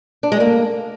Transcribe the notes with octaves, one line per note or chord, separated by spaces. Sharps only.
D4
G#3
A#3